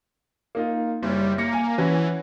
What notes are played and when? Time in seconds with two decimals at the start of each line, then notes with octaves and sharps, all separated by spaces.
0.55 A#3 D#4 F4
1.03 F#1 G3 C#5
1.38 A#3 A#6 C#7
1.53 G#5
1.78 E3 C#4 F#4 B4